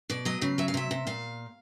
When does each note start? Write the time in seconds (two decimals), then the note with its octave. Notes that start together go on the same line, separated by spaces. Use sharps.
0.10 B2 D5
0.25 F#3 D#5
0.41 C#3 F5
0.58 F#3 E5
0.68 F5
0.74 C3 E5
0.91 C3
1.07 A#2 F5